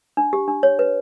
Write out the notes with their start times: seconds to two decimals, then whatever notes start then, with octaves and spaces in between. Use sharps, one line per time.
0.17 D4
0.33 G4
0.48 D4
0.63 C#5
0.79 B4